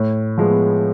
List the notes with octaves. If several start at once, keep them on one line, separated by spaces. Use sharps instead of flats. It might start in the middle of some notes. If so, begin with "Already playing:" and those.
Already playing: A2
F3 G#3 B3